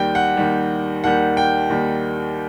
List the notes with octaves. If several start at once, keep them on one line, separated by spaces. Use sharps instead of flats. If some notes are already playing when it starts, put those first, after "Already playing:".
Already playing: D#2 D#3 G3 G5
F#5
D#2 D#3 G3
D#2 D#3 G3 F#5
G5
D#2 D#3 G3